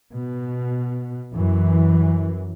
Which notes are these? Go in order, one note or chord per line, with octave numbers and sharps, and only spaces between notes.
B2
F#2 E3